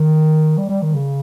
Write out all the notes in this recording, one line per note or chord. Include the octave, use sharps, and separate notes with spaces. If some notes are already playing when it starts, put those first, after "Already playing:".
Already playing: D#3
G3
G3
D#3
C#3